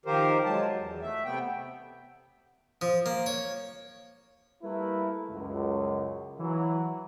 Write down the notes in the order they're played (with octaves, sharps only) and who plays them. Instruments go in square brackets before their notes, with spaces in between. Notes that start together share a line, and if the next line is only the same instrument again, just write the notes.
[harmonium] D#3 F3 F4 G4 A#4 C5
F#3 G#3 A5
E2
A3 E5
C3 B3 G5
[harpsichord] F3
A#3
C#5
[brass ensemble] G3 A3 A#3 E4 A#4 B4
C#2 F#2
E3 F#3